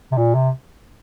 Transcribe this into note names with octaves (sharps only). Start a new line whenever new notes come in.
C3
A#2
C3